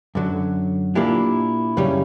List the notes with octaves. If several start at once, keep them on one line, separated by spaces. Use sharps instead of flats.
F#2 D3 F#3
A#2 A#3 D4 E4 G4
F#2 C#3 G3 C#4